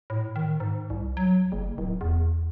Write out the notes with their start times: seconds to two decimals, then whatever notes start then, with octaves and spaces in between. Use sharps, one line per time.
0.10 A2
0.36 D#3
0.60 G#2
0.90 C2
1.17 F#3
1.52 F#1
1.78 D1
2.01 E2